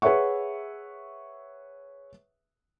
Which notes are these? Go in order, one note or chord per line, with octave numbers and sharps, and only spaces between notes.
G#4 B4 C#5 E5 F#5 C#6